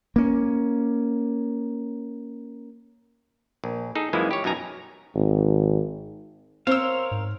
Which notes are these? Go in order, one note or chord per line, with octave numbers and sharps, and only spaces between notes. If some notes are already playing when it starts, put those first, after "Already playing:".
A#3 C#4
A#1
D#4 G#4 A4
F#2 E3 F3 G#3 A#3 E4
G4 C#5
F#2 B2 D#4 G#5 A#5
G#1
C4 A#4 C5 C#5 F5 E6
G#2